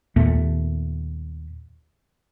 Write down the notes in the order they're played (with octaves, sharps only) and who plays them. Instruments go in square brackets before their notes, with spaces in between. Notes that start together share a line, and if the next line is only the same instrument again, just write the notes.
[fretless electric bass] D#2 A#2 A3 B3